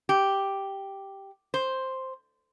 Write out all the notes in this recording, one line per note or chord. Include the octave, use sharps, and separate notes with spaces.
G4
C5